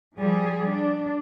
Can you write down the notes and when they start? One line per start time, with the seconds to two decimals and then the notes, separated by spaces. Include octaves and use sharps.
0.20 F3 G3 G#4
0.70 D4